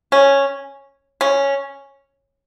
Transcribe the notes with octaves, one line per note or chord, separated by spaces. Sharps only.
C#4
C#4